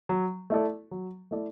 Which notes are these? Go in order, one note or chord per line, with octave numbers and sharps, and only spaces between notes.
F#3
A3 E4 A4 D5
F#3
A3 E4 A4 D5